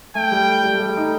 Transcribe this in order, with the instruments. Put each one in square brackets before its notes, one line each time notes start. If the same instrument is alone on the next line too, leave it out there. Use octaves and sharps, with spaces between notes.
[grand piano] A3 [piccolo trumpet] G5
[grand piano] G3
G3
A3
G3
D#4